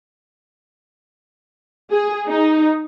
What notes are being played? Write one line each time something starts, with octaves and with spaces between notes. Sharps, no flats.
G#4
D#4